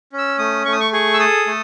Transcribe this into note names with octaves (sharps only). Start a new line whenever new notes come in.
C#4
E6
A3 D#6
A3 C#6
D#6
C#6
G#4 C#6
E6
A4 D#6
A3